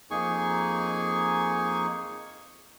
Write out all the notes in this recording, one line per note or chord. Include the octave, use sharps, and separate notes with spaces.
F2 A#3 D#4 G#4 G#5 C#6